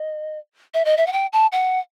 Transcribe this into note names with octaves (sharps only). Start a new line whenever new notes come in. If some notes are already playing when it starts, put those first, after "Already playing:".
Already playing: D#5
E5
D#5
E5
F#5
G5
A5
F#5